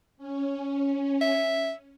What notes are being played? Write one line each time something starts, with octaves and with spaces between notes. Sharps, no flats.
C#4
E5